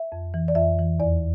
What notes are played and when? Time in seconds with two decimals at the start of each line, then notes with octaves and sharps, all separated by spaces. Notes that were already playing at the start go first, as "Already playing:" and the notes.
Already playing: E5
0.12 F2
0.34 E3
0.48 D5
0.55 F2 E5
0.79 E3
1.00 E2 D5